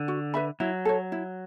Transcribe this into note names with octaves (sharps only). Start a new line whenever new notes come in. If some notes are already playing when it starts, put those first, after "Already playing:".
Already playing: D3
F#4
B4 E5 B5
F#3 E4
A4 C#5
E4